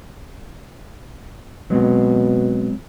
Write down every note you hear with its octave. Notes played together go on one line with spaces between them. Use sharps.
B2 F#3 G#3 C4